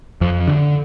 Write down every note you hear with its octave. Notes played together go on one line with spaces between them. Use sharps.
F2 F3
D3